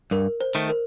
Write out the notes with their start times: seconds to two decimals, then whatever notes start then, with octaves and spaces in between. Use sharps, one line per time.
0.11 G2 A#4
0.41 C5
0.55 D#3 A3
0.69 A#4